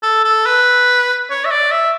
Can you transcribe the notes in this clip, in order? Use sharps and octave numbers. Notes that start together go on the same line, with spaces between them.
A4
A4
B4
C#5
E5
D5
E5